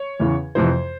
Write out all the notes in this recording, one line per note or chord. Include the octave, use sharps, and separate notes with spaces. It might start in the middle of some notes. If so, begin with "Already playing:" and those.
Already playing: C#5
E2 C#3 E3
F2 C3 E3 C5